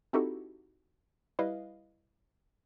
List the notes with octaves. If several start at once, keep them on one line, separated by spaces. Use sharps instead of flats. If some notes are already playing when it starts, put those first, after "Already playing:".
C4 D#4 E4 F#4 G4 A4
G3 E4 B4 D#5 F5